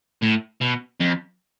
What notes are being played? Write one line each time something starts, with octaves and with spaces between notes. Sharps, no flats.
A2
B2
F2